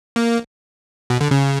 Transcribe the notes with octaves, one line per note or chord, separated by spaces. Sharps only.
A#3
B2
D3
C#3